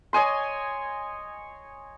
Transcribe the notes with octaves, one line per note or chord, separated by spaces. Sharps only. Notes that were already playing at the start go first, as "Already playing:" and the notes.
C#5 D#5 G#5 C6